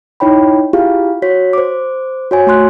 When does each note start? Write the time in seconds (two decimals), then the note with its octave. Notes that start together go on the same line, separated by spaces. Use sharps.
0.20 D#4 E4 C#5 G5 B5
0.73 E4 F4 G4 G#4 F5
1.22 F#4 C#5 B6
1.53 C5 D6
2.31 F#4 C#5 G#5
2.47 A3 F#4 C6 F#6